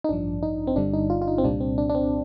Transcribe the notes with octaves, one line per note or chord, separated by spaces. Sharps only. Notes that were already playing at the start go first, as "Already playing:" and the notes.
D#4
A1 G2 F3 D4
D#4
C4
G1 G2 D3 G3 D4
D#4
F4
F4
D#4
C4
C2 A#2 G3 D4
C4
D4
D4
C4